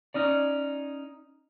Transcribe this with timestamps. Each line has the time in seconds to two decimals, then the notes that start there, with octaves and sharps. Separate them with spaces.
0.14 C#4 D#4 D5